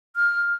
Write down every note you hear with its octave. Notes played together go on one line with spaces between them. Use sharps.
F6